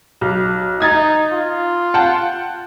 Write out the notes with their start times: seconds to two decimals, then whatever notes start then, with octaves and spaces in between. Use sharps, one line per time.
0.21 B1
0.80 D#4 D#6 G#6 A6
1.31 F4
1.94 F#5 G5 A5